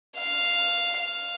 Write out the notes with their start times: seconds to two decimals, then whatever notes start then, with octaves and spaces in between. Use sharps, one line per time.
0.18 F5
0.98 F5